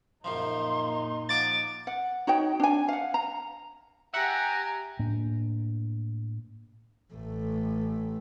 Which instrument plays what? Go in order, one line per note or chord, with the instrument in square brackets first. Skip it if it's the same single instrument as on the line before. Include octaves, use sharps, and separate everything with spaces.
[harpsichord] F#2 C#3 F3 [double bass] A#2 D#4 [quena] C6
[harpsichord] F3 F#4 [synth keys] D6 A6
[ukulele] F#5
D#4 F#4 C#5 G5
D4 G#5
F5 F#5
A#5
[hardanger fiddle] G4 G#5 [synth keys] E5 F#5 [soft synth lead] A#5
[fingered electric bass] A2 A#3 D4
[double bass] A1 A3